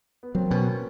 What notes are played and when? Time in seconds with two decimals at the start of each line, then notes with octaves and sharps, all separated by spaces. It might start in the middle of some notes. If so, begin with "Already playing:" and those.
0.23 B3
0.34 F#3 A#3 C4
0.50 B2 B3 C#4